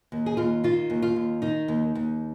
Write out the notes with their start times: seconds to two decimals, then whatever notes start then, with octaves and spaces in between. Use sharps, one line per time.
0.12 D#2
0.26 G#4
0.37 D#2 F4
0.64 D#3 F4
0.90 D#2
1.02 F4
1.16 D#2
1.42 D#3 D#4
1.68 D#2
1.95 D#2